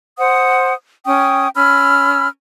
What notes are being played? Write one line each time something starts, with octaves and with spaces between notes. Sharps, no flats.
C5 F#5 D#6
C#4 G5 C#6 D#6
C#4 B5 E6 F6